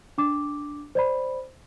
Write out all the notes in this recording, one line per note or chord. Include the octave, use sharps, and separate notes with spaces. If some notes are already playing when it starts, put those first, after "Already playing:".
D4 D6
C5 D5 B5